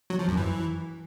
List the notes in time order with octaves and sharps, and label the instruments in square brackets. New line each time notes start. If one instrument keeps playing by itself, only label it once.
[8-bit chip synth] F#3
F3
F#2
E3